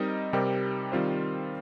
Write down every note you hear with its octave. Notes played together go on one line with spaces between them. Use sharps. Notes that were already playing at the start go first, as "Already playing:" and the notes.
Already playing: G3 C4 D#4 A#4 D#5
C3 G3 C4 G4 A#4
D#3 G3 C4 F4 C5